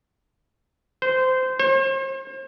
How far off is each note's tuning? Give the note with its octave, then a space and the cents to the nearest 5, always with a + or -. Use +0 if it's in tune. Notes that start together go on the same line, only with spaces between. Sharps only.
C5 -20
C5 +40